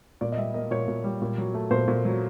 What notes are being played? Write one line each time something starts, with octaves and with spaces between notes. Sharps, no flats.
A#2 D5
D#5
G3 E5
A#3 D#5
A#2 C#5
A#2
G3
A#2
F#3
A3
A#2 C5
A#2
F#3